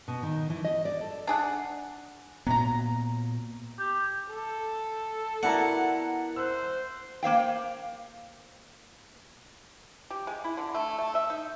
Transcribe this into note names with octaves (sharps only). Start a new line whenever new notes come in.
B2
D#3
E3
D#5
D5
A4
D4 G#4 F#5
A#2 F#3 B3 A#5
G4
A4
B3 E4 F#4 A#4 D5 F#5 A5
C5 E6 F#6
A#3 C5 F5 G5
G4
G#3
E4
D3
A3
A3
E5
D#4